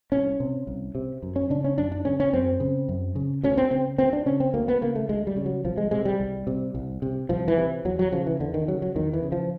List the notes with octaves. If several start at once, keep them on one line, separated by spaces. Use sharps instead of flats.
C2 C#4
C3
C2
C3
F#2
C#4
C#3 D4
C#4
F#2 D4
D4
C#3 C#4
C#4
F#2 C4
C#3
F#2
C#3
D2 C#4
C4
C#3 C4
D2 C4
D4
C#3 C#4
C4
D2 A#3
B3
C#3 A#3
A3
D2 G#3
G3
C#3
F#3
C2 F3
G#3
C3 G#3
G3
C2
C3
C2
C3
C2 F3
E3
C3
E2 F#3
F#3
C#3 F3
E3
E2 D3
D#3
C#3 F#3
F#3
E2 D#3
E3
C#3
F3